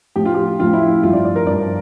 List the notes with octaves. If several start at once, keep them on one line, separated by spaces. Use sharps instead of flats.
A2 F3 G4
F4
G4
A2 F3 F4
E4
F4
G2 F3 F4
D5
D5
A#4
G2 F3 D5